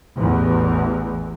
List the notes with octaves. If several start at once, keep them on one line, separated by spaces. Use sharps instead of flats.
A1 E2